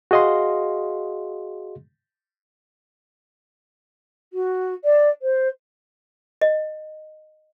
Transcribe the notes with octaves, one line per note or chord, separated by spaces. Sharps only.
F#4 G#4 D#5 F5 C6
F#4
D5
C5
D#5